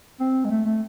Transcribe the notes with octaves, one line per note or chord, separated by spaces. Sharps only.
C4
G#3
A3
A3